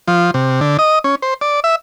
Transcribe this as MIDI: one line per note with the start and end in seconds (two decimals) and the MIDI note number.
0.08 0.31 53
0.34 0.60 48
0.61 0.77 50
0.79 0.99 75
1.04 1.15 61
1.22 1.34 72
1.41 1.60 74
1.64 1.75 76